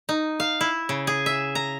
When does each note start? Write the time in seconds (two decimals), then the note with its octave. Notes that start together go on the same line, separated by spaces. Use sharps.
0.09 D#4
0.40 F5
0.61 E4
0.89 C#3
1.07 G#4
1.26 E5
1.55 A#5